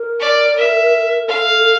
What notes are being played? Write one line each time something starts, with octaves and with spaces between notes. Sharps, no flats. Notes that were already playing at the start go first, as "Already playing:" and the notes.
Already playing: A#4
D5
E5
A4 F5